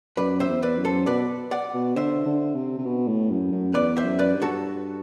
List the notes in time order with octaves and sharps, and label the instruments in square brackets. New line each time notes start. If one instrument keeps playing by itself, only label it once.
[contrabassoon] F#2 [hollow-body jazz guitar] B4 D5
[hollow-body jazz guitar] C5 E5
[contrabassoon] E2
[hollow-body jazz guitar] B4 D5
[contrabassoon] F#2
[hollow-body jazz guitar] A4 C5
[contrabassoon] B2 [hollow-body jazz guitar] B4 D5
[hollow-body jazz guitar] D5 F#5
[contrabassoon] B2
[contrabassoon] D3 [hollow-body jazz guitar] C5 E5
[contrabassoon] D3
C3
C3
B2
A2
F#2
F#2
[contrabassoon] E2 [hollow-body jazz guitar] B4 D5
[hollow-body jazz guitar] C5 E5
[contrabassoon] F#2
[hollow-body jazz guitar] B4 D5
[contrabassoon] G2
[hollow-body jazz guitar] F#4 A4